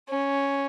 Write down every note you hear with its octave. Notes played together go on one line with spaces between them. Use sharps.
C#4